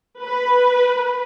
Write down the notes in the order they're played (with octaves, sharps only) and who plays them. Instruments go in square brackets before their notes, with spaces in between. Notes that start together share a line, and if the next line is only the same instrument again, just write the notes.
[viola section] B4